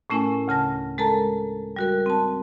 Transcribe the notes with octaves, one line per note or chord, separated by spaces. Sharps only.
A2 A3 C#4 E4 A#4 G#5
D2 C#3 A5 A#6
G#3 A4 A#4 A5 A#5
G3 F#4 A#4
C4 A5